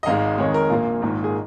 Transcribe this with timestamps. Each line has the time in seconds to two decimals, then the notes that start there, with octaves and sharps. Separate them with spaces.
0.03 D#5
0.06 G#1 G#2 G#3 F5
0.38 F2 D#3 G#3 C#5
0.54 A#4
0.70 A#1 A#2 A#3 F4
1.02 G#1 G#2 D#3 A#3
1.24 G#4